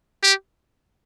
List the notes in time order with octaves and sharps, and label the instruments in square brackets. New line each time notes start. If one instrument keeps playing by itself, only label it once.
[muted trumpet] G4